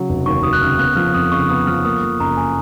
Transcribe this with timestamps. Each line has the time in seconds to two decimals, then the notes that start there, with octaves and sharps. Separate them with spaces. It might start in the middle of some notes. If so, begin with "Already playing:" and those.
Already playing: C#3 F#3
0.09 F1
0.26 D#2 C#6
0.43 F#3 D#6
0.53 F#6
0.61 C#3 F6
0.79 B3 F#6
0.96 F3 F6
1.14 F2 D#6
1.32 C#3 C#6
1.49 B3 D#6
1.67 F3 F6
1.85 A#3 D#6
2.03 F3
2.20 F#1 A#5
2.37 G#5